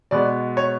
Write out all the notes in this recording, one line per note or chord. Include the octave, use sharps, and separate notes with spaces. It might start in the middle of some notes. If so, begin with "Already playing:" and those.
B2 G#3 B3 D5
C#5